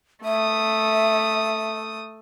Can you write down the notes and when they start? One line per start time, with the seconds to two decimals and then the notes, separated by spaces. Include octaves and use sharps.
0.24 A3 E5 D#6